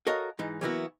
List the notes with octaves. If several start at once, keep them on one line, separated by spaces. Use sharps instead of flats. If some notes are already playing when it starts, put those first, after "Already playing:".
F#4 A4 A#4 C#5 D#5 F5
G#2 E3 D#4
E3 F#3 A#3 B3 E4 F#4